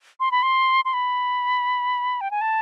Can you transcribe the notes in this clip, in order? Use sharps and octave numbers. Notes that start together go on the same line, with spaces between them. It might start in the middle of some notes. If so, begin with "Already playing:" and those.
C6
B5
C6
C6
B5
G5
G#5
A5